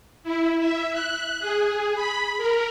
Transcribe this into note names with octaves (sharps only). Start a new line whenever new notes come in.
E4
E5
F#6
G#4
B5
A#4